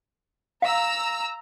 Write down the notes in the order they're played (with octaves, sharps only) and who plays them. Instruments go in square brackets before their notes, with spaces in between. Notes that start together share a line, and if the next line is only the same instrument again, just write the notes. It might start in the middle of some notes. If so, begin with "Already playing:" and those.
[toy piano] F5 [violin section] A#5 E6